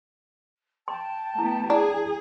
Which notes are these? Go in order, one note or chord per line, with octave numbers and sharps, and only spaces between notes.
G5 A5 C6
A3 B3 E4
D4 E4 G#4